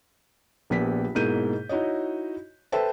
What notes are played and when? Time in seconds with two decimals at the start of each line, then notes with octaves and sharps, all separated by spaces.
0.70 A#1 A#2 B3 G4 B6
1.15 G#2 B2 A#3 E4 G6 D#7
1.69 D#4 E4 F#4 C#5 D#5
2.72 A4 B4 C5 E5 G5 A5